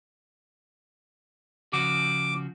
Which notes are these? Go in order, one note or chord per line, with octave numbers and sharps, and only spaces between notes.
C#3 F3 F#4 D6